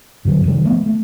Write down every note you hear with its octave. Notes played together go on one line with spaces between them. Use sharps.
F#2 D3 F#3
C3 D#3 E3 G3
F3 A3 B3
A3